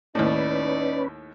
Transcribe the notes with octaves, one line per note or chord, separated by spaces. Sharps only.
D#2 A2 C#4 D#4 B4 D5